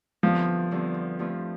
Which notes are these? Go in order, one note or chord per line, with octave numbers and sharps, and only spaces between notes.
E2 D3 F3 G3 C4
E2 D3 G3 C4
G2 F3 A3 C4 F4